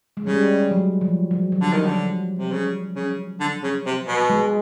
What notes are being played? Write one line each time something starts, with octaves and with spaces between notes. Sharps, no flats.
G#3
C#3 G3
F#3
F3
F#3
F#3
D3 G3
D#3
D3
C3
C#3
C#3
D3
C#3
C3
B2
G#3